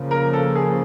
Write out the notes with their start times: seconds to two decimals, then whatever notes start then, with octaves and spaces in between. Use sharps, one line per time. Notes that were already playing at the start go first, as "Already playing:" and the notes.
Already playing: C#3 F3 A#3
0.11 A#4
0.33 A4
0.55 G#4